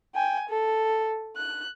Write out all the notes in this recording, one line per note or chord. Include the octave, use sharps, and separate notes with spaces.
G5 G#5
A4
F#6